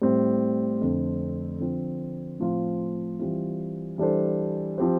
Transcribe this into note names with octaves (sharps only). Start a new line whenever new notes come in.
A2 G3 C4
F2 D3 A3 C4
D3 F3 C4
A2 F3 C4 F4
E3 G3 C4 F4
E3 G3 D4 A4 C5
F3 C4 G4 C5